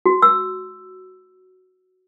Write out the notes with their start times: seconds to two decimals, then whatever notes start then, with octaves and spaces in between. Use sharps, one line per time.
0.06 F#4
0.22 E6